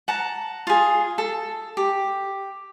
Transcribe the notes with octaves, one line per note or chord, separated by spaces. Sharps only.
F#5 A5 A#5
F4 G#4
A4
G4